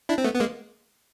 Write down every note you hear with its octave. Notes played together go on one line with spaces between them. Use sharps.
D4 E4
C4
A3 B3
B3
G#3 A#3